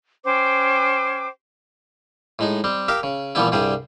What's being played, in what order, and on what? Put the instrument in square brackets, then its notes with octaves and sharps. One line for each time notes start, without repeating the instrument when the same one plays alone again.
[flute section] C#4 C5 G5 D6
[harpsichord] A2 G#3 D#4
G3 C4
G4 A#4 E5 F5
C#3
A#2 E3 F3 G3 B3 E4
C2 G2 G3 G#4 C5